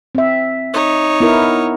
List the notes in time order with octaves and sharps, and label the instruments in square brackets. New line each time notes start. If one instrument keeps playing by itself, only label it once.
[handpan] C4 E5
[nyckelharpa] D#4 C#5
[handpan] B3 E4 A#4